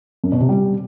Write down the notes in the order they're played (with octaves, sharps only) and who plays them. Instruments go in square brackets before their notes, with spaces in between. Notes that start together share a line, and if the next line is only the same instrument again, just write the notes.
[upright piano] F#2
B2
C3
G3